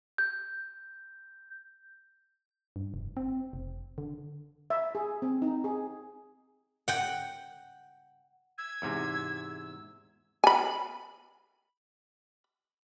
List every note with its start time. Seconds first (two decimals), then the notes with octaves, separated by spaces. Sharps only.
0.18 G6
2.76 G2
2.94 F1
3.17 C4
3.53 F1
3.98 D3
4.70 E5
4.95 G#4
5.22 C4
5.42 D#4
5.64 G#4
6.88 F#5 G5
8.58 E6 G#6
8.82 E2 G#2 C3
10.44 G#5 B5